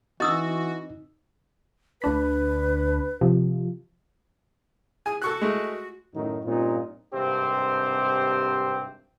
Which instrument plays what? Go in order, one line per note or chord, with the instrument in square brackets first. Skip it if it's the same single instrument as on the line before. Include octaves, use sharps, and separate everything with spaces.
[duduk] E3 [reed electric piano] C4 D#4 [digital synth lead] F#4 [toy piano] D#5 D#6 E6
[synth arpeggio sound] D2 D4 B5 [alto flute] B4
[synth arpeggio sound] C3 F3
[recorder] G#4 [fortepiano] G#5
[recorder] F#4 [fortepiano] A4 C#6 F#6
[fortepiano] G#3 A3
[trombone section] F#2 A2 D#3 F#3 D#4
G2 A#2 C4 C#4 D#4 F4
G#1 G2 C3 C4 G4 C5